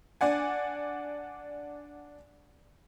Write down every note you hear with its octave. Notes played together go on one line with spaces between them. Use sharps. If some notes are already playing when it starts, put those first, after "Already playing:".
D4 D5 F#5 G#5